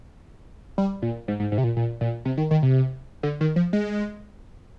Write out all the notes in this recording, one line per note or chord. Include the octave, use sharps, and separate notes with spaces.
G3
A#2
G#2
G#2
G#2
C3
A#2
A#2
A#2
C3
D#3
D#3
C3
D3
D#3
F3
G#3